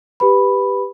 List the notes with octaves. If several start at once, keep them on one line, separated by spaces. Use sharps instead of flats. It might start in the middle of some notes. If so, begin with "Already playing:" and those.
G4 B4 B5